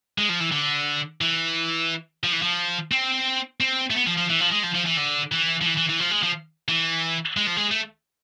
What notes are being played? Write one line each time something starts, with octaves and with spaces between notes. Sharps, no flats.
G#3
F3
E3
D3
E3
F3
E3
F3
C4
C4
A3
B3
F3
F3
E3
F3
G#3
F3
F3
E3
D3
E3
F3
E3
E3
E3
F3
G#3
F3
E3
G#3
F3
G#3
A3